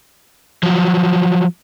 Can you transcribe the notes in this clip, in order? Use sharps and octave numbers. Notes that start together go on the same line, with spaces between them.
F3 F#3